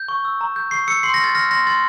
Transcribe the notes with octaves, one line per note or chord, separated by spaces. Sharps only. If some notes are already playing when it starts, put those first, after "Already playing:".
Already playing: G6
C#6
E6
A#5
G6
C#6 C7
E6 C#7
C6 C7
A#6
F6 A6
F6 A#6
C6 A#6
C6 A6